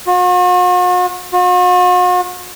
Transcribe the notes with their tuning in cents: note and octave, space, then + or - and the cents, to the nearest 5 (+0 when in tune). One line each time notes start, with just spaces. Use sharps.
F#4 -45
F#4 -45